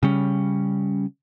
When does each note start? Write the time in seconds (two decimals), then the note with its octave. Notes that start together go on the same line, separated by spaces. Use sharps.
0.03 C#3 G3 C#4